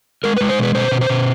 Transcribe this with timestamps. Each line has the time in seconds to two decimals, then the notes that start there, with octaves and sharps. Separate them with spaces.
0.24 G#3 A#4
0.36 G#3 B4
0.49 C5
0.59 B2 B4
0.75 B2 C5
0.91 B2
1.01 C5
1.09 B2